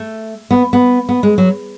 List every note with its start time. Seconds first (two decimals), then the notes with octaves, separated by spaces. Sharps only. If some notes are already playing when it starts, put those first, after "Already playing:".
Already playing: A3
0.51 B3
0.73 B3
1.09 B3
1.23 G#3
1.38 F#3